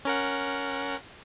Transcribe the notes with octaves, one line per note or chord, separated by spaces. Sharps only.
C#4 A#4 F#5